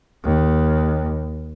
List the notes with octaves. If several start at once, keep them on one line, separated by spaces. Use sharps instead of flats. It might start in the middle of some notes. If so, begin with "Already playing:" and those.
D#2